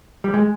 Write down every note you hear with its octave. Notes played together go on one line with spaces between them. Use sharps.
G3
G#3